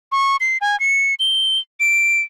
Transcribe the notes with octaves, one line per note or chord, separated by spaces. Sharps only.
C#6
C7
G#5
C#7
G7
D7